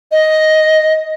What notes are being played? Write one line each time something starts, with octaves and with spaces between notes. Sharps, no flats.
D#5